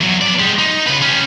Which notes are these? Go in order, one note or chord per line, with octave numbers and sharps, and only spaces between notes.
E2 F#3
B3 D5
G#3 G4
D#4
C#3 B4
C#4 G4